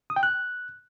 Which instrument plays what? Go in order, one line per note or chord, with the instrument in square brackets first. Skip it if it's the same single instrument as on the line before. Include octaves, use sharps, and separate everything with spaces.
[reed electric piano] D#6
G5
F#6